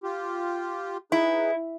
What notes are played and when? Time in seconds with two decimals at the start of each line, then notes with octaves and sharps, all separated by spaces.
0.04 F4 G4
1.12 D#4 E4 G#4 B4